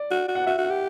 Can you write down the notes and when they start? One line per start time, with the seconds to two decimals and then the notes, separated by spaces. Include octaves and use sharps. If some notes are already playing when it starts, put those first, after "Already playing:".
Already playing: D5
0.11 F#4
0.28 F#4
0.35 F#5
0.47 F#4 E5
0.58 F#4
0.64 F#5
0.70 G4